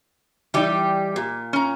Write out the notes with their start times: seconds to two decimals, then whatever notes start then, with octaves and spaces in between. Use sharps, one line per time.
0.54 E3 G3 D#4 G4
1.16 A#2
1.53 C#4 A#5